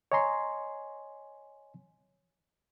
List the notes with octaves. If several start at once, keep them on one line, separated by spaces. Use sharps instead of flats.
C#5 D#5 G#5 A#5 C6